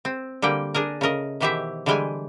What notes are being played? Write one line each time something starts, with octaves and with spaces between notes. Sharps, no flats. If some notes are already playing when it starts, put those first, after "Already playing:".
C4
D3 G3 A#3 G5
D4 G#4 A#4
C#3 A3 A#4 D#5
B2 D#3 E3 G4 C5 E5
D3 E3 G3 G#3 G5 G#5